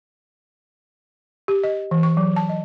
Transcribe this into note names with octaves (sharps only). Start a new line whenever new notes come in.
G4
D#5
E3
C#6
F#3
A5
D#5